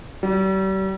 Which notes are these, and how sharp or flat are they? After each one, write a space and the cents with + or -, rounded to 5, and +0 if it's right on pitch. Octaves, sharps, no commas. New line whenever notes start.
G3 -40